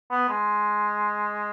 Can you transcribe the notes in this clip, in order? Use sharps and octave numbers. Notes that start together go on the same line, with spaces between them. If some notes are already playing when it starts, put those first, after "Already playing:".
B3
G#3